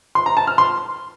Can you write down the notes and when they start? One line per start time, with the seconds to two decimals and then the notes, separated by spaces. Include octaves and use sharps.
0.15 C6
0.26 A#5
0.37 A5
0.47 F6
0.58 C6